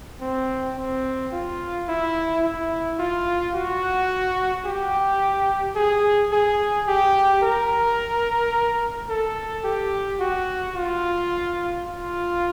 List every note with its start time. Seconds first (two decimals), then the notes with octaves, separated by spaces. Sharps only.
0.21 C4
0.77 C4
1.32 F4
1.88 E4
2.44 E4
2.99 F4
3.55 F#4
4.66 G4
5.76 G#4
6.32 G#4
6.88 G4
7.43 A#4
9.09 A4
9.64 G4
10.20 F#4
10.76 F4
11.87 F4